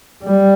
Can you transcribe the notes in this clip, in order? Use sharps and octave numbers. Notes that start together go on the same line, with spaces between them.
G3